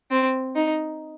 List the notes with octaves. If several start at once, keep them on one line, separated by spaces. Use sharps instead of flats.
C4
D#4